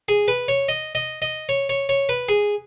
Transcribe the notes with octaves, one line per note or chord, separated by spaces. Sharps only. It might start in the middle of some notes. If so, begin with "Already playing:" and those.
G#4
B4
C#5
D#5
D#5
D#5
C#5
C#5
C#5
B4
G#4